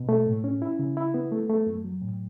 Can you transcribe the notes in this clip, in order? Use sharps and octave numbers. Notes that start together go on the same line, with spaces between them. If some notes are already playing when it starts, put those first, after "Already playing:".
Already playing: B2
A3
A2
C#4
E4
C#3
E4
B3
A3
A3
F#2
F#3
A2